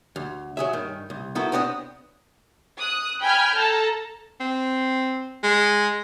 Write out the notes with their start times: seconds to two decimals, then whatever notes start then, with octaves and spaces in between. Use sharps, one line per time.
0.16 D2
0.57 F#3 G#4 E5
0.73 G2 D#3
1.10 C2
1.35 D#3 B3 E4 F#4 A4
1.52 B3 C4 D4 D5 D#5
2.79 D#6 F#6
3.21 G5 G#5 B5 F6 G6 G#6
3.56 A4 A5 A#5
4.40 C4
5.43 G#3